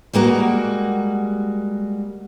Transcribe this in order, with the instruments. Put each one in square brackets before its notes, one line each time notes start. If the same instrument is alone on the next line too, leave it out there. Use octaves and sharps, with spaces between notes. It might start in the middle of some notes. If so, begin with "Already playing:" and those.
[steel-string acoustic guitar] G3 G#3 A#3 F#4